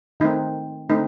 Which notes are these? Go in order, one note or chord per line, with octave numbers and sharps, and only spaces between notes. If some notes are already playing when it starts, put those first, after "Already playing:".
D#3 A3 C4 D#4
D3 A3 C4 D#4